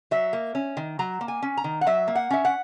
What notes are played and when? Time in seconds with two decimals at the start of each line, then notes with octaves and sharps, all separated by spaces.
0.11 F#3 E5
0.33 A#3
0.55 C#4
0.77 D#3
0.99 F#3 A#5
1.21 A#3
1.28 G#5
1.42 C#4
1.57 A#5
1.64 D#3
1.81 F#5
1.87 F#3 E5
2.08 A#3
2.15 F#5
2.30 C#4 E5
2.45 F#5